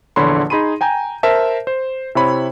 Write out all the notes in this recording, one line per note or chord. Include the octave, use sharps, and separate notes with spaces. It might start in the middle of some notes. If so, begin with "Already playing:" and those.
A#1 E2 D3 C#5 B5 C6
D#4 G#4 B5 C6 D#7
G5 G#5 A#5 G6
A#4 C5 E5 A5
C5
C3 E4 C5 C#5 B5